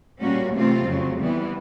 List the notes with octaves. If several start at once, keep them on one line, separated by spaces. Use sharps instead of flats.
A#2 G3 A#3 C#4 F#4
C3 E3 A3 C4 F4
F2 C#3 F#3
E3 G3 B3